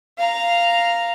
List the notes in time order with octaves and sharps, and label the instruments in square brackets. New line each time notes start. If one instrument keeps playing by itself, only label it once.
[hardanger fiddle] F5 A#5